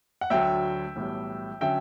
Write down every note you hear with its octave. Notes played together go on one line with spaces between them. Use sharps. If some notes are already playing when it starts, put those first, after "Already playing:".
F#5
D2 D3 F#3 E5 G5
B1 A2 E3 G3
D3 F#3 C#4 E5 G5